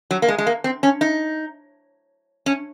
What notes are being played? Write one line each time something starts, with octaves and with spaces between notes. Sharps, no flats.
F#3
A#3
G#3
G#3
A#3
C4
C#4
D#4
C#4